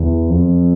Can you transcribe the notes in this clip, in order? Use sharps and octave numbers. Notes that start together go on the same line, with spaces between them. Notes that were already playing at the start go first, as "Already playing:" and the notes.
Already playing: E2
F2